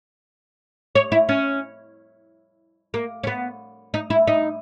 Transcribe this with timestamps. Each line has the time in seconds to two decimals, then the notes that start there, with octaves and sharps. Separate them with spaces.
0.95 C#5
1.12 E4
1.29 C#4
2.94 A#3
3.24 C#4
3.27 B3
3.94 D#4
4.10 E4
4.27 D#4